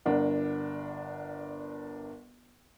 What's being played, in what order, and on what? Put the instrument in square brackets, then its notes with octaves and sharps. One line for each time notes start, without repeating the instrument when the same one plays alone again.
[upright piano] G1 D4 A#4 F#5